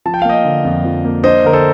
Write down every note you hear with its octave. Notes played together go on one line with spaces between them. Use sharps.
F3 A5
G5
F5
A#3 D#5 G5
D3
F2
F3
A#3
D4 C5 D#5
D3 A#4
A4 C5